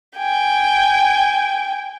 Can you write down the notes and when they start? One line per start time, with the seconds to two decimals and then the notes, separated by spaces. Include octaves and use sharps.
0.17 G5 G#5